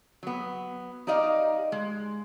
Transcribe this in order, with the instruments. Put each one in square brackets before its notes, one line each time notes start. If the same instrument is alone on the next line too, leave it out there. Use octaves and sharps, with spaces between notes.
[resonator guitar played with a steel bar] F#3 B3
D#4 G4 D5 D#5 F5
G#3